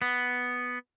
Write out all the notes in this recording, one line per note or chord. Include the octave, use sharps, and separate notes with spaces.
B3